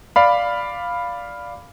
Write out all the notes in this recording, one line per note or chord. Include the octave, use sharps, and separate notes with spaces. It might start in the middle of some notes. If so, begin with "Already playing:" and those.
D5 F5 B5